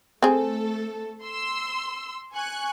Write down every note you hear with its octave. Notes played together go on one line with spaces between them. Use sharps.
A3 C4 G#4 A4
C6 E6
G#5 C#6 F#6